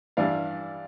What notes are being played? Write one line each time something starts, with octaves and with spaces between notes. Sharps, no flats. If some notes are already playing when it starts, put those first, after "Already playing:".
G2 E3 G3 D5 F5